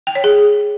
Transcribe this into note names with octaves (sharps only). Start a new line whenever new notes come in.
G5
C#5
G#4